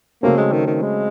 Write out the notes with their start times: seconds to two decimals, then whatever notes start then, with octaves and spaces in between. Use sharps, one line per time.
0.23 C#3 F#3 A3 A#3 C4
0.37 G#3
0.52 D#3
0.66 D#3
0.82 G#3